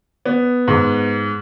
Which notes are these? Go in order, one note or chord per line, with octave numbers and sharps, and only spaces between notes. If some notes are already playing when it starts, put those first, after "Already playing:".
B3
G#2